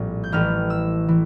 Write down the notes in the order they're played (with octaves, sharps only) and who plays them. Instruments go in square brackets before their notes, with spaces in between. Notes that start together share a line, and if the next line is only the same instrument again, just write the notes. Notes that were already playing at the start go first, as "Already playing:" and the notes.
Already playing: [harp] A#1 A2 G3 C4
G6
A1 A2 E3 A3 F6
E6
E3